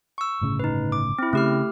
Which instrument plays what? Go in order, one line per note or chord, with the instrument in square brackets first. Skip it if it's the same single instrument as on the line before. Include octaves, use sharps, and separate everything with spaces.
[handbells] C#6 E6
[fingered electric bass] G1 A2 C#3
[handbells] D#4 B4
D6
C4 E4
[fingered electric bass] C#3 [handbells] A3 G4 F6